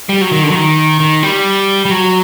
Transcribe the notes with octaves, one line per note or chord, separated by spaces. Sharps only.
G3
F#3
D#3
D3
F#3
D#3
D#3
G3
G3
F#3